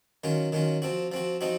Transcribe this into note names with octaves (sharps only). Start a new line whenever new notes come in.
D#3 F#3 C#4 F4
D#3 F#3 C#4 F4
F3 C4 F#4
F3 C4 F#4
F3 C4 D#4 F#4